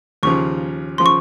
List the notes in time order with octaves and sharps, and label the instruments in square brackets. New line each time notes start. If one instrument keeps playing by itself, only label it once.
[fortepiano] D#2 C#3 F3 [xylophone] C#6
[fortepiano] C#3 F3 [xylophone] C6
[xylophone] C#6